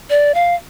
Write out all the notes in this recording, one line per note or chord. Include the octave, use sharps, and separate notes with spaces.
D5
F5